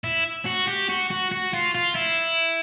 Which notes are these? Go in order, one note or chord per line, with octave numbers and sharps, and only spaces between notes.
E4
F#4
G4
F#4
F#4
F#4
F4
F4
E4